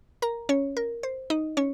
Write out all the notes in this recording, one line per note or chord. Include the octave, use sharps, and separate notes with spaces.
A#4 A#5
C#4 C#5
A#4
C5
D#4 D#5
C#4 C#5